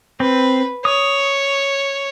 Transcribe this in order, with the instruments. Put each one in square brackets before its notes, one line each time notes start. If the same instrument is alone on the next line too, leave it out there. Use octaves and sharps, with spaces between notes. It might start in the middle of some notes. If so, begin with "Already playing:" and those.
[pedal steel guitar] C4 [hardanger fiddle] B4
[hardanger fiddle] C#5 [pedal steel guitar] D#6